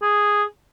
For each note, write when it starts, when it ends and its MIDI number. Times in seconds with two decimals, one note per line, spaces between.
0.02 0.43 68